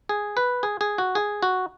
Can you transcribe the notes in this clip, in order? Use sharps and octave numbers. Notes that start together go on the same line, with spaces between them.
G#4
B4
G#4
G#4
F#4
G#4
F#4